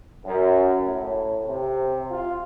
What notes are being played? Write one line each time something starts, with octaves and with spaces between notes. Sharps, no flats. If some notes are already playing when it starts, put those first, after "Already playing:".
F#2
A2
C3
F4